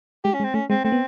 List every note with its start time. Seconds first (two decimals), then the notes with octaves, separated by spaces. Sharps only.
0.24 G#3 G4
0.34 C#4
0.40 G#3
0.44 C4
0.54 A3 C#4
0.70 G#3 C4
0.84 A3 C4
0.92 B3